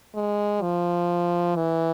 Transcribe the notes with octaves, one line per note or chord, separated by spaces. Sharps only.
G#3
F3
E3